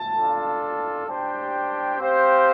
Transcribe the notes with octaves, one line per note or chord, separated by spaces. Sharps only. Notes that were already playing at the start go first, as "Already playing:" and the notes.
Already playing: A5
D4 F4 A4
G3 D4 G4 C5 G5
C4 G4 C5 F5